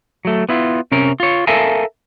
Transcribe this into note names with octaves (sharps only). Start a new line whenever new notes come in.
F#3 A3
B3 E4 F4
C3 C#4 A#4
F4 C#5
A4 A#4 E5 F5 G#5 A5